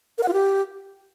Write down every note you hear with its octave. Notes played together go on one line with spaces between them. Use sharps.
A#4
F#5
F4
G4